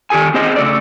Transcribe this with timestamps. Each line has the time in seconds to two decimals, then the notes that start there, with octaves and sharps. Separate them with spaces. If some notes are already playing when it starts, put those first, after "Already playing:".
0.10 D#3 G4 A4 G#5
0.34 C4 G#4 C5 D#5
0.56 C#3 A3 D5